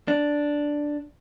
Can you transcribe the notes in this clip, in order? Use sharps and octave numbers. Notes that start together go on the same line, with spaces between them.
D4